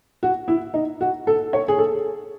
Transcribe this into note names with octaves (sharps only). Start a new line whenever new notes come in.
F#4
E4
D#4
F#4
A4
C#5
G#4
A4